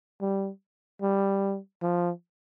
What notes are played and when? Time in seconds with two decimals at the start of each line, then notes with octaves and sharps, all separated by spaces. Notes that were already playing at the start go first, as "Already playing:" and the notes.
0.21 G3
1.02 G3
1.82 F3